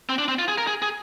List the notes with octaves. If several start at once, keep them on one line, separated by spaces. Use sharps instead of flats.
C4
D4
C4
F4
G#4
A#4
G#4
G#4